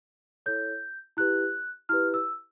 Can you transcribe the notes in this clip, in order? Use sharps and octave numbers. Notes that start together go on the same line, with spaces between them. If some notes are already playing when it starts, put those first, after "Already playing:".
E4 A4 C#5 G6
E4 G4 B4 F#6
E4 G4 B4 F6
E6